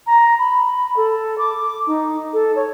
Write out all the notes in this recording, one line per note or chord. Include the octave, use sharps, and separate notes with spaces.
A#5
B5
A4
D6
D#4
A4
C#5